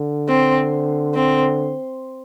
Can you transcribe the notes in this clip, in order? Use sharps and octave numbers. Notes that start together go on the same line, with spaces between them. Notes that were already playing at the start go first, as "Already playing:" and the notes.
Already playing: D3
C4
C4